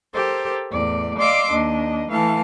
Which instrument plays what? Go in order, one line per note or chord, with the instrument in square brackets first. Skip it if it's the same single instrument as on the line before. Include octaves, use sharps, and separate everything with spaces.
[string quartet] G4 A4 A#4 C5
E2 A2 D5
D5 D#5 F5 C6 D6 E6
D#2 D4 D#5
E3 A3 F5 A5